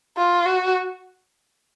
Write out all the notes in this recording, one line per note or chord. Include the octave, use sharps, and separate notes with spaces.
F4
F#4